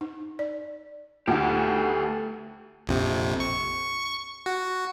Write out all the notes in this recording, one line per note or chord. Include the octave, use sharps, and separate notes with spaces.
D#4
D5
D2 D#4 F4 G4 A4 F#5
A#1 F2 C3
C#6
F#4